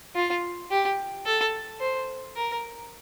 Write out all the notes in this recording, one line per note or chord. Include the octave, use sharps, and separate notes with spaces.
F4
G4
A4
C5
A#4